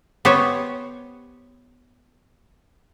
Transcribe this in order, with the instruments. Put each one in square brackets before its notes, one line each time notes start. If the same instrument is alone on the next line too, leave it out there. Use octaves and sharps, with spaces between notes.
[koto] B3 G4 C5 C#5